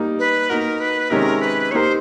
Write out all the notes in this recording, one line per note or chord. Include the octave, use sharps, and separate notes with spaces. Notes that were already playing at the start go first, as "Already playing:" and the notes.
Already playing: G3 A#3 D#4
B4
A#3 D#4 F#4 A#4
B4
C3 D#3 G#3 C#4 A#4
B4
A#3 D#4 G4 A#4 C5 C#5